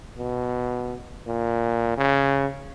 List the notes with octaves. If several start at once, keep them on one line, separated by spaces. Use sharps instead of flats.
B2
A#2
C#3